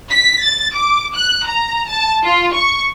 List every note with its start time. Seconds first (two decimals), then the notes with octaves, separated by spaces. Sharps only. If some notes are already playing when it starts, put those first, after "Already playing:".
0.11 B6
0.43 A6
0.75 D6
1.15 F#6
1.46 A#5
1.89 A5
2.24 F4
2.55 C#6